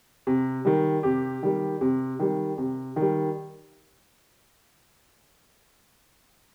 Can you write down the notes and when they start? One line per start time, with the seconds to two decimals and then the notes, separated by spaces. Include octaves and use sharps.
0.27 C3
0.65 D#3 G3
1.03 C3 G4
1.43 D#3 G3
1.81 C3
2.19 D#3 G3
2.58 C3
2.96 D#3
3.02 G3